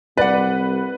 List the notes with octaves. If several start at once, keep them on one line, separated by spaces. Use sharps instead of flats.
C2 B4 D5 F#5